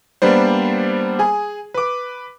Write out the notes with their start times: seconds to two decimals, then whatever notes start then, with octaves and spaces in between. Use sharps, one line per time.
0.22 G3 A#3 B3 D4 C5
1.19 G#4 G#5
1.74 B4 D6